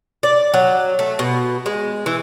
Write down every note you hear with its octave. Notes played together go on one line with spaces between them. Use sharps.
D5
F#3
A3
B2
G#3
E3